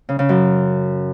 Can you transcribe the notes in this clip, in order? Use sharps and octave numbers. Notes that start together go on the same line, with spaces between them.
C#3
C#3
F#2